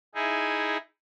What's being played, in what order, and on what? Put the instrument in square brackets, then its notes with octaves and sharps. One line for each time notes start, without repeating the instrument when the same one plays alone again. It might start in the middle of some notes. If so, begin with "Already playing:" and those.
[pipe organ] D#4 E4 G#4